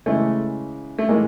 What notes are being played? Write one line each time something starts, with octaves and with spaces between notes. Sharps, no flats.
C#3 E3 G#3 A3
A3
A2 E3 G#3 A#3